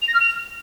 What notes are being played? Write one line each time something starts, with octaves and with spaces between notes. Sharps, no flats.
F7
A#6
F6
F7